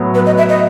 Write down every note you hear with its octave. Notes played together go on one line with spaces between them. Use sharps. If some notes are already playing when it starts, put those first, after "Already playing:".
Already playing: A2 F#3 B3
B4
D#5
E5
D#5